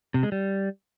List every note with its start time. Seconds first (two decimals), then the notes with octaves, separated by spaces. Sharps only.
0.14 C3
0.23 G#3
0.32 G3